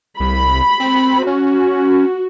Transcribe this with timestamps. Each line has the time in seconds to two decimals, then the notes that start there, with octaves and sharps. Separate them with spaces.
0.20 C2 B5
0.80 C4
1.27 C#4 F#4